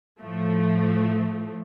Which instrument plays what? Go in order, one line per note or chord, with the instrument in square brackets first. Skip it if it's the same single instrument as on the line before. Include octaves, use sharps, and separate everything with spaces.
[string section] A2 F3 A3